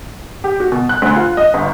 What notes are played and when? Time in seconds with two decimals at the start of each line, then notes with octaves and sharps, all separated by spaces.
0.44 G4
0.60 F#4
0.72 B2
0.89 F#6
1.02 D2
1.16 F4
1.37 D#5
1.54 G1